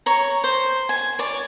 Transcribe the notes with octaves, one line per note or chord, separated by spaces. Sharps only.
C#5 A#5
C5
G#5
C#5 D5